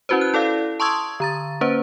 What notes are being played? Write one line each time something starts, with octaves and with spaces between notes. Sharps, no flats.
C#4 E4 F#4 B4 C5
F#6
E4 A4 D5 F5
A5 C6 C#6 D#6 E6 G#6
D3 A#5 A6
A#3 C#4 B4 C5